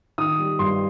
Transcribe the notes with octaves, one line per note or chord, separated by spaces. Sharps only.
D#3 D#6
G3
G2 C6